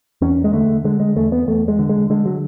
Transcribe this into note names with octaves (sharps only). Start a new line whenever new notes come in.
E2 C#4
G#3
D3 A3
D3 G#3
G#3
E2 A3
B3
E2 A3
G#3
D3
G#3
D3 G#3
F#3